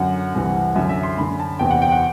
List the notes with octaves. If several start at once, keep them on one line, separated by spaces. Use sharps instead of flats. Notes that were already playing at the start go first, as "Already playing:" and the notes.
Already playing: F#2 D3 F#5
C2 C3 E3
F#2 D3 E5
E5
C6
F#2 D3 B5
A5
E2 C3 E3 G5
F#5
G5
F#5